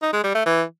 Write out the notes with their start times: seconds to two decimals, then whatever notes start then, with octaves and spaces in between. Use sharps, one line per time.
0.02 D#4
0.13 G#3
0.24 G3
0.35 A3
0.46 E3